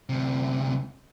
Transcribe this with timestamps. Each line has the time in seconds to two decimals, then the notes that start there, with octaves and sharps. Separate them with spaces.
0.09 D2 C3